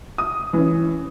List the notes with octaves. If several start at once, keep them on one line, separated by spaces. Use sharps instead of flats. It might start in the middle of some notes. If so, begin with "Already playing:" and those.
D#6
E3 C#4